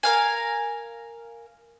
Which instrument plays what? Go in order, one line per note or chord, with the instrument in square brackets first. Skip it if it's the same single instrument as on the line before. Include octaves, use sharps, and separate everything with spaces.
[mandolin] A#4 F5 G#5